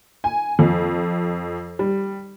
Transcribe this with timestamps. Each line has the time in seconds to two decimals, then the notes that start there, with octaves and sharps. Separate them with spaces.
0.24 G#5
0.59 F2
1.79 G3